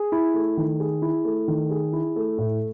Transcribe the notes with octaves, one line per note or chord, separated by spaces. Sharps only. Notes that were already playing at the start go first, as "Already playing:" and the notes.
Already playing: G#4
E4
A3
D#3
G#4
E4
A3
D#3
G#4
E4
A3
A2